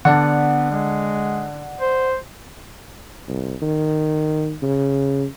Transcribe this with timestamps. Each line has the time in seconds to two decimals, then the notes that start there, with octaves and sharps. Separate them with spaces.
0.05 D3 B3 D5 F#5 A5
0.71 G#3
1.81 C5
3.28 C2
3.62 D#3
4.63 C#3